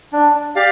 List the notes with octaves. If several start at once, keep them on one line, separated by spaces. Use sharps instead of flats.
D4
G4 D5 F5